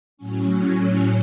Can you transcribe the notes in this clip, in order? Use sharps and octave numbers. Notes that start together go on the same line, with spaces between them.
A2 F#3 C#4